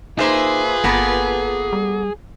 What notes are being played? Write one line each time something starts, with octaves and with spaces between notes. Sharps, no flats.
A#3 D#4 F4 G#4 B4 C5 E5
G1 A#3 B3 A4
G3